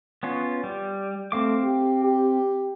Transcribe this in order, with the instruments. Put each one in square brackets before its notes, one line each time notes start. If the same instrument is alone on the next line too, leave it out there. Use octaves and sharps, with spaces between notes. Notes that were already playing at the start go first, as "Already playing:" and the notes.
[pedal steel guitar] B3 C#4 F4
G3
[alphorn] A3 [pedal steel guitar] C4 F5 D6
[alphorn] G4
G4